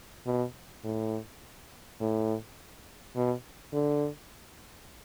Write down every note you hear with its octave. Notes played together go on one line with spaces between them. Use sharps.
B2
A2
A2
B2
D3